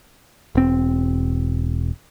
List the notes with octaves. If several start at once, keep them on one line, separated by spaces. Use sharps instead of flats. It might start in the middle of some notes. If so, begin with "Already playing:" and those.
E1 C4